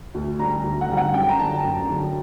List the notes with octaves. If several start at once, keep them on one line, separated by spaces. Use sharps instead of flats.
D2
D3 G3 A#5
D2
F#5
D3 G3
F#5
F#2 G5
A#5
D3 F#3 A5
F#2
D3 F#3